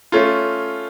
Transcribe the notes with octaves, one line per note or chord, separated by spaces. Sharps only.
A3 C#4 F4